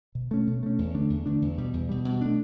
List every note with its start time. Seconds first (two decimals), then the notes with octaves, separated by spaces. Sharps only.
0.15 B2
0.31 A3 C#4
0.47 B2
0.63 A3 C#4
0.79 E2
0.94 D3 A3 D4
1.10 E2
1.26 D3 A3 D4
1.42 E2
1.58 B2 G3
1.73 E2
1.89 B2 G3
2.05 B2
2.21 A3 D4